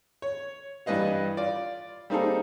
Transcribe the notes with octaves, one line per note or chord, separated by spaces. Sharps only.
C#5
G2 E3 G3 B4 D#5 F5
F4 D5
G3 A#3 C4 D#4 G#4 A4